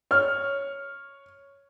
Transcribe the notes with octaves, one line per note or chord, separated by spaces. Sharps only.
C#5 F6